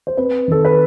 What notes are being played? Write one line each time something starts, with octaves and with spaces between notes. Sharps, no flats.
C5
C4 B4
D#3 A4
B4